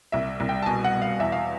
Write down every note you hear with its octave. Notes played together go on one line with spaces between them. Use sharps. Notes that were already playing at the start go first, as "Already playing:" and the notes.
C2 E5
C2
G5
A5
B2 G#5
F#5
B2
F5
E2 E5
F5